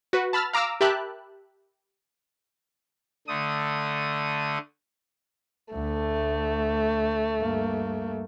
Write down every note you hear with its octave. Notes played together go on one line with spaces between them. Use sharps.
F#4 B4
A5 B5 E6 F6 A6
F5 A#5 D6 E6 F6
G4 A#4 E5 A5 B5 F#6
D3 A3 D#6
D2 A3
G2 A#3